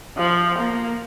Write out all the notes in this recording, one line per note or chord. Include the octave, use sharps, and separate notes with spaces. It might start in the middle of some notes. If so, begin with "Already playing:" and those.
F3
A#3